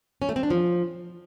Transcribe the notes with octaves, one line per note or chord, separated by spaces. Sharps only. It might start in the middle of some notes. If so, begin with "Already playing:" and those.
C#4
A3
C4
D4
F3